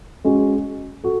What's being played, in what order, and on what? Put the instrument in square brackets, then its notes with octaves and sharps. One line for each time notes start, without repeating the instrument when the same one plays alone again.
[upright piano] G#3 C#4 F#4
F#4 A4